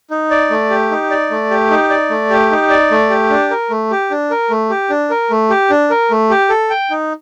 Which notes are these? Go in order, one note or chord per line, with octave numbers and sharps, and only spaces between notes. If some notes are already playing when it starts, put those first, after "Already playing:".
D#4
D5
A3
G4
D#4
D5
A3
G4
D#4
D5
A3
G4
D#4
D5
A3
G4
D4
A#4
A3
G4
D4
A#4
A3
G4
D4
A#4
A3
G4
D4
A#4
A3
G4
A4
G5
D#4